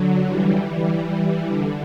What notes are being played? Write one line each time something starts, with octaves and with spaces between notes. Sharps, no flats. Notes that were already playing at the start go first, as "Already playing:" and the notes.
Already playing: D3 F#3
E3 G3
D3